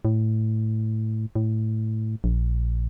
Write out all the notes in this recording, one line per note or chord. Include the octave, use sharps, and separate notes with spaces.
A2
A2
A#1